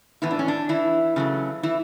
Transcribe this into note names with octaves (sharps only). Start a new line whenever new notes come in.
A2 E3 B3 E4
D4
C#4
D4
E3 E4
C#3 F#3 A3
E3 E4